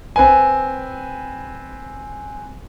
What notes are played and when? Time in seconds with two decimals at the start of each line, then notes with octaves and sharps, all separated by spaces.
0.16 C4 B4 G#5